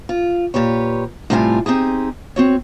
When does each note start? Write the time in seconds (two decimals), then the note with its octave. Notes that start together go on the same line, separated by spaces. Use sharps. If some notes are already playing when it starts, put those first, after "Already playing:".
0.09 F4
0.54 A#2 G4 B4 C#5
1.30 A2 C3 G3 F4 F5 G#5
1.66 C4 D#4 G4 G#4
2.36 C4 F#4 C#5